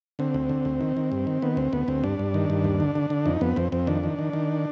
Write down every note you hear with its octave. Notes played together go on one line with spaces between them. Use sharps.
D3 C4
D2
D3
D2
D#3
D#3
G2
D#3
D#3 B3
D2 C4
D2 B3
D2 C4
G2 D4
G2
D#3
G2
D#2
D3
D3
D3
F2 D#4
F2 B3
F2 C4
F2 C4
D#3 D4
D#3
D#3
D#3